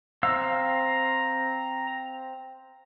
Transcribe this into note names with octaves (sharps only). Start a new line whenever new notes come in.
C4 F5 A#5 E6